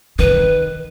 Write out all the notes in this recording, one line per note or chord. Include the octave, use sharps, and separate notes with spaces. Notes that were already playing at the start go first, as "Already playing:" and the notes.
D#3 B4